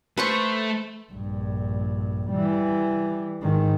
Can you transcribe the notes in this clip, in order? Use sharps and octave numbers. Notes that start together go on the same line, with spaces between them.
A3 B4 C5 C#6
A#1 G2
E3 G3
G#2 D#3